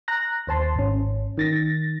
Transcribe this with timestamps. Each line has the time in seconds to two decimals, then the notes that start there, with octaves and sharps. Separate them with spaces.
0.08 A#5 F#6 A#6
0.47 D#2 C5 A5 C6
0.76 G#1 C#4
1.37 D#3 A6 A#6